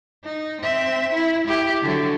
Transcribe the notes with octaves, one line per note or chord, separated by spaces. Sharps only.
D#4
C4 E5
E4
E4 G4
D3 F#3